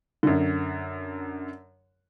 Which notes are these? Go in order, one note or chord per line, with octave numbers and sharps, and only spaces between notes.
F#2 D3